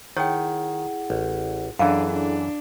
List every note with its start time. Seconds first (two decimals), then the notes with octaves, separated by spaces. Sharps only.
0.17 D#3 E4 G#4 C#5 F#5 G5
1.10 A1
1.79 F#2 E3 D4 E4 G#4 A4 F5
2.11 D4